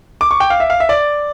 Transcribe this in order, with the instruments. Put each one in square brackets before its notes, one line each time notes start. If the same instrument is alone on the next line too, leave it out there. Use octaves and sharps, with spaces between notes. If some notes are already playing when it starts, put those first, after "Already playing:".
[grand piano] D6
C#6
G5
F5
E5
F5
E5
D5